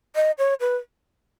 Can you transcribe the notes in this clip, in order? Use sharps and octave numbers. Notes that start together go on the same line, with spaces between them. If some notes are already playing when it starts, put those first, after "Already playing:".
D#5
C#5
B4